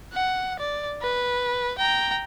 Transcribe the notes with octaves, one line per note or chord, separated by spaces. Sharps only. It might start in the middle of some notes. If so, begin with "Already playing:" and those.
F#5
D5
B4
G5 A#5